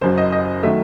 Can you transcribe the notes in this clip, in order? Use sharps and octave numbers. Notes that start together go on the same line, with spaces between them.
F#1 F#2 F#3 C5
D#5
D#5
D#3 F#3 A3 E5